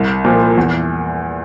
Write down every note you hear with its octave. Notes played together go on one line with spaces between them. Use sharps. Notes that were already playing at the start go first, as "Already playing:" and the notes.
Already playing: C2
A#2 F3
E2